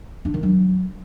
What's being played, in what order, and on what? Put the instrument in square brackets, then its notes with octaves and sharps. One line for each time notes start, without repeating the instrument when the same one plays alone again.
[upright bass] D4
D#3
F#3